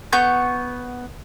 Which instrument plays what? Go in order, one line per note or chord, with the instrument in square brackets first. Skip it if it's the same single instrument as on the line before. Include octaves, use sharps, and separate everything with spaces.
[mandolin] B3 C#6 G6